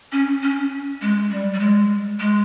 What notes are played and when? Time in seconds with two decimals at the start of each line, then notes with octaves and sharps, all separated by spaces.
0.12 C#4
0.43 C#4
1.01 G#3
1.31 G3
1.54 G3
1.60 G#3
2.20 G#3